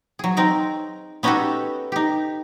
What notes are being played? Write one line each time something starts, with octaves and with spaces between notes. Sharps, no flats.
F#3 G#4
C4 D#4 A#4
B3 C#4 D#4 F#4 G4 A4
D#4 G4